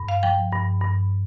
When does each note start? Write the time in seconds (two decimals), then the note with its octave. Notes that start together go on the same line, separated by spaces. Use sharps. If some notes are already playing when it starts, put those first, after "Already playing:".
Already playing: G2
0.09 F5
0.23 F3 G5
0.52 G2
0.81 G2